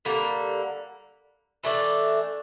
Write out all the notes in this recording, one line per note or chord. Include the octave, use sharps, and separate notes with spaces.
D3 G3 A#3
E3 A3 D4